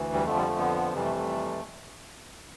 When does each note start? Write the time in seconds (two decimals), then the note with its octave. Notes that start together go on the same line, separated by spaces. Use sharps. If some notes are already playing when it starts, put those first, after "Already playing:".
Already playing: D2 E3
0.14 G3
0.25 F2 D3 F3 A3
0.36 G3
0.48 A3
0.59 B3
0.94 F2 C3 E3 G3
1.04 A3
1.16 A3